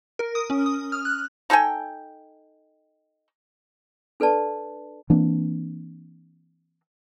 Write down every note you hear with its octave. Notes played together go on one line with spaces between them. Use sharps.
A#4
D#6
C#4
D#6
F6
F#6
D#4 A4 G5 G#5
D4 A4 B4 D5 A5
E3 A#3 C4 D4